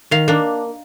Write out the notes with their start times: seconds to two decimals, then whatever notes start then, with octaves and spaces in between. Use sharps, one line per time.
0.11 D#3 F5
0.28 A#3 D4